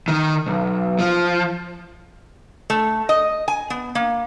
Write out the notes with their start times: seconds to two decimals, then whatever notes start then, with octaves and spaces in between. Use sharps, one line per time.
0.08 D#3
0.46 B1
0.99 F3
2.70 A3
3.09 D#5
3.48 G#5
3.70 B3
3.95 A#3